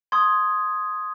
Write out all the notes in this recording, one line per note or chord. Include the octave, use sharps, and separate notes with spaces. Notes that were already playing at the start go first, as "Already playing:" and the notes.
C6 D#6 G#6